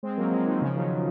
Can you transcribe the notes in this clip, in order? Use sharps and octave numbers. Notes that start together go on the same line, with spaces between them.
G#3 C4
F#3 A#3
F3 G#3
D#3
C#3 F3
D#3 F#3